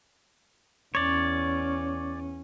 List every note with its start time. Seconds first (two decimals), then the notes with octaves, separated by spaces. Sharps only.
0.95 E2 C#4 C#5 D5